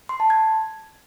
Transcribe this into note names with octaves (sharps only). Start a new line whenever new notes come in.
C6
A5
G#6